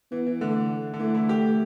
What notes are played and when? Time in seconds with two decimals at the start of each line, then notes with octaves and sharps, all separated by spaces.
0.11 E3 B3
0.26 E3
0.41 D3 A3
0.94 D3
1.00 E3 A3
1.14 E4
1.29 G4